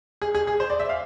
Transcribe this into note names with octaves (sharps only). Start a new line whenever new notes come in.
G#4
G#4
G#4
C5
D5
E5
F5